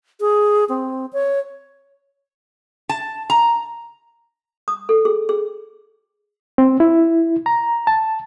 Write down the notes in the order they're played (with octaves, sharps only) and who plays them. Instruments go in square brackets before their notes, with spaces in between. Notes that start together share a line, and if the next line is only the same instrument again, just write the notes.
[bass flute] G#4
C4
C#5
[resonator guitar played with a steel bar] A5
A#5
[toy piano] D#6
A4
G#4
G#4
[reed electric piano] C4
E4
A#5
A5